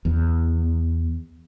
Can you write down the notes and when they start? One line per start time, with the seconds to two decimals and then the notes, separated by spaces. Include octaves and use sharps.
0.05 E2